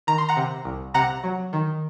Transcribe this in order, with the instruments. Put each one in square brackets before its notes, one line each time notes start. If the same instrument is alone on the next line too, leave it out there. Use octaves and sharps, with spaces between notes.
[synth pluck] D#3 A#5
C6
F#5 A#5
C3
C2
C3 F#5 A#5
F#3
D#3